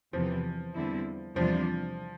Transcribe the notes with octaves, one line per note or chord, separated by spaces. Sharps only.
E2 C3 E3 F3 B3
E2 D3 G3 C4 E4
E2 C3 F3 G3 D4 F4